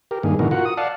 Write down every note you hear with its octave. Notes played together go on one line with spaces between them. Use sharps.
G4 A#4
G2 D#3 A#3 G#4
G#2 B2 D3 E3 F#4 A#4
F4 F#4 A#4 F#5
D#6
D5 F5 F#5 A5